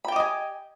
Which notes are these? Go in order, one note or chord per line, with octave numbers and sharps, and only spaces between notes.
G4 D#5 G5 G#5 B5